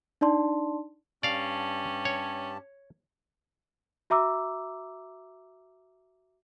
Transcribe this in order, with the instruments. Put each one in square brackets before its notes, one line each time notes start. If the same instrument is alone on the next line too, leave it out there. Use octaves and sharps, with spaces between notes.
[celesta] D4 D#4 D5 A5 C6
[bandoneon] G2 G4 A5 [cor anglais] C#4 [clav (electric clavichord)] D5 F5
[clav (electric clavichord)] C#5
[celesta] F#4 E5 A#5 D6 E6